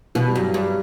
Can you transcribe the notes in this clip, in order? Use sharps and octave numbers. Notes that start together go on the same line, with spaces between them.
B2 E3
G3
G2 F#3
G2 G3